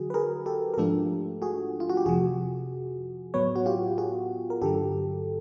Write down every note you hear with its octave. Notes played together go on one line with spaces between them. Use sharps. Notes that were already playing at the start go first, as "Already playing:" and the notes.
Already playing: D3 F#3 F#4 G#4
B4
G#4 A#4
G4 A4
A#4
G#2 F3 A3 D4 F4 G4 A4
F#4 G#4
F4
F#4
G4
F2 C3 F3 F#4 G#4
A2 F#3 B3 B4 C#5
F#4
F4 G4
F#4 G#4
A#4
G2 D3 F#3 G4 A4